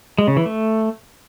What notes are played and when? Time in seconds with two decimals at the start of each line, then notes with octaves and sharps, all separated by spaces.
0.18 G#3
0.28 C#3
0.37 E3
0.46 A3